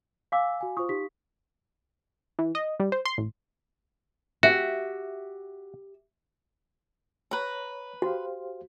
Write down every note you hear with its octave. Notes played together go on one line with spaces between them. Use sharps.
F5 G#5 D6 E6
F#4 G#5
F4 C5 C#6 D#6
D#4 G4 B6
E3
D#5
G3
C5
C6
A1
F#4 G4 E5
B4 C#5 A#5
F#4 G4 C5 F5